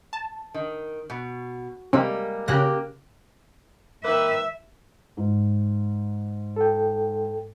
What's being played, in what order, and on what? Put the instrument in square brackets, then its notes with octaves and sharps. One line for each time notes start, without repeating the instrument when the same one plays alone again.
[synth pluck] A5
[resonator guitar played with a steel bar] D#3
B2
[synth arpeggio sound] C3 [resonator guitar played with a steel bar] G3 G#3 A#3
[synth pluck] C#3 F#6 A#6 [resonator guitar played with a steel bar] A#3 G4
[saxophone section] D#3 A#3 B4 [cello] E5
[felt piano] G#2
[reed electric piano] A4 G5